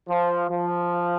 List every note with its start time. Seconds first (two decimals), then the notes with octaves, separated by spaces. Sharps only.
0.08 F3
0.50 F3